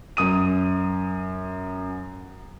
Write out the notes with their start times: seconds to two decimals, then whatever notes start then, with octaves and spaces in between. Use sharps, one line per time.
0.17 F#2 D#6 D#7